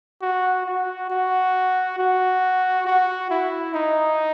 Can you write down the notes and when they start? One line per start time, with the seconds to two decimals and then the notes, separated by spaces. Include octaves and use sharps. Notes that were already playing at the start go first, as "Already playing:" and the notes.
0.22 F#4
0.66 F#4
1.10 F#4
1.99 F#4
2.87 F#4
3.31 E4
3.74 D#4